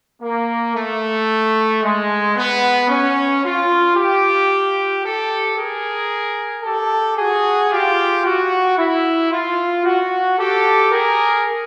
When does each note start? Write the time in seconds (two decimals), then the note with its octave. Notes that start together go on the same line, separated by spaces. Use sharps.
0.22 A#3
0.75 A3
1.83 G#3
2.36 B3
2.89 C#4
3.43 F4
3.96 F4 G4
5.03 G4 A4
5.57 G#4 A#4
6.63 G4 A4
7.17 F#4 G#4
7.70 F4 G4
8.24 F#4
8.78 E4
9.31 F4
9.85 F#4
10.37 G4 A4
10.91 G#4 A#4